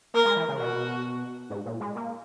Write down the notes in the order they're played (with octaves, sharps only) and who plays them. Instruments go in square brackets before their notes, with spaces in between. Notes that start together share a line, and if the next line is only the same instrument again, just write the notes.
[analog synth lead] A#3 [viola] A#4
[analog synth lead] G#3
E3
C#3
[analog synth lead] B2 [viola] F#4
[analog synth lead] G#2
A#2
G#3
A#3